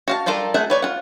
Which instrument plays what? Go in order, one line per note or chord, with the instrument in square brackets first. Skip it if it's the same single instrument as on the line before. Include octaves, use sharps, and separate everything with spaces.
[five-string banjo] F#4 F5 A5
G3 D4 F4 A4 A#4
A3 G#4 E5 F#5
B4 C#5 D5
F4 F#5